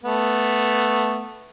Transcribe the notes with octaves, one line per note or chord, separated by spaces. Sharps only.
A3 B3